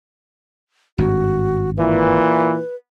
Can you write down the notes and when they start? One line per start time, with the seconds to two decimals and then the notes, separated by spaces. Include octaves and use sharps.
0.98 G#1 G2 F#4
1.77 A#2 E3 B4